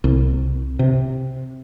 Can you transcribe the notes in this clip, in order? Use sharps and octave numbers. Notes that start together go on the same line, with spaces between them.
C2
C3